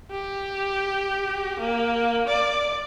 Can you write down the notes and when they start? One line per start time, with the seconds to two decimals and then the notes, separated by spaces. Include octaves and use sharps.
0.11 G4
1.60 A#3
2.28 D5